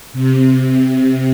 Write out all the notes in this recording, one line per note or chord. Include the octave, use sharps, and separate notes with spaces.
C3
C3